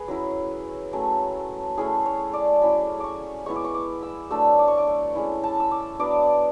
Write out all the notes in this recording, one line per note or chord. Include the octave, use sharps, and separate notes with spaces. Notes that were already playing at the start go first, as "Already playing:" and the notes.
Already playing: G#4 B4
F#3 C#4 E4
F#3 A3 C#4
A3 C#4 E4 G#4
C#5
D5
F#3 C#4 E4 B5
C#6 D6
G#3 B3 E4 C#6
D6
C#6
D6
E6
F#3 A3 D4 E6
D6
C#6
D6
C#6
G#3 C#4 E4
A5
E6
D6
F#3 B3 D4 D6